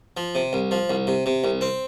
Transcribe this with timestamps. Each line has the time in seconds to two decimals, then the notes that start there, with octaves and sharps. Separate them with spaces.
0.17 F3
0.35 C3
0.53 C2
0.71 F3
0.90 C2
1.07 C3
1.26 C3
1.44 C2
1.61 C4